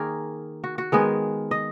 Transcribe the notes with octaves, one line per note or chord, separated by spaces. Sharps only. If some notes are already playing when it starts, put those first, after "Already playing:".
Already playing: D#3 A#3 G#4 A#4
F#4
F#4
D#3 G#3 B3 G#4
D#5